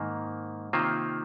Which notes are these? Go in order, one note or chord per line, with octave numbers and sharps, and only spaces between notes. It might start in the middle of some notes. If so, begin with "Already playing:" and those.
Already playing: G#2 D#3 A#3
C3 D#3 A#3 F4 C5